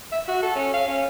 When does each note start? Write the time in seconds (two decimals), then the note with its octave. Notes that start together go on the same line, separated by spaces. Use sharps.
0.12 E5
0.28 F#4
0.42 A4
0.56 C#4
0.74 F5
0.88 C#4